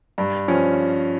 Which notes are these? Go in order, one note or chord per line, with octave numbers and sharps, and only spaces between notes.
G2
F3 C#4